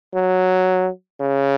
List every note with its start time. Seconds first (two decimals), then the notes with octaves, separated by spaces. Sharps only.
0.15 F#3
1.20 C#3